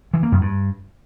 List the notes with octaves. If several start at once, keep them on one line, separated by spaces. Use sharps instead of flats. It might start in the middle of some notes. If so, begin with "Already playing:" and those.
E3
A#3
F#2
G2